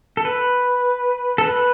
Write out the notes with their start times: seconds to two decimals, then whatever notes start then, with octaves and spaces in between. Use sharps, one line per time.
0.17 A4
0.25 B4
1.38 A4
1.44 B4